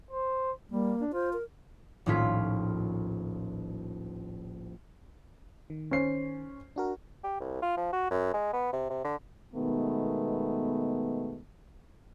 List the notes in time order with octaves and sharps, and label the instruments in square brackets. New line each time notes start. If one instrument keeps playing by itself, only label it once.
[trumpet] C5
[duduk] G3 [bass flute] A#3
[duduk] D4
[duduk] F4 [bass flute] C5
[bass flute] A#4
[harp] D#1 A#1 A2 C#4 F4 B6
[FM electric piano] D#3
[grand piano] C#4 C5 C7
[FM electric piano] D4 F#4 A#4
[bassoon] G4
C2
F4
F3
F#4
F#2
G#3
B3
C3
C3
D3
[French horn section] B2 D#3 G#3 A3 B3